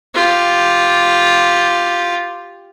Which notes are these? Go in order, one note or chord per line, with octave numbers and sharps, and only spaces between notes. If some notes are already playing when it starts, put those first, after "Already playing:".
F4 G4